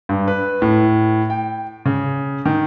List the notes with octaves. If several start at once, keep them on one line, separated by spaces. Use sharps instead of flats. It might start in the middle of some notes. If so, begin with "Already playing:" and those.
G2
B4
A2
G5
C#3
D#3